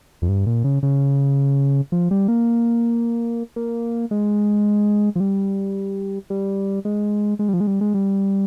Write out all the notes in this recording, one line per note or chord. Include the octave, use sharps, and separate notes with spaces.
F2
G2
A#2
C#3
C#3
F3
G3
A#3
A#3
G#3
F3
G3
G3
G#3
G#3
G3
F3
G#3
G3
G#3
G3